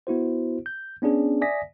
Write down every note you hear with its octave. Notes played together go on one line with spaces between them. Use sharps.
B3 E4 F#4 C5
G6
B3 C#4 D4 G#4
D5 E5 G#5 D#6 A#6 B6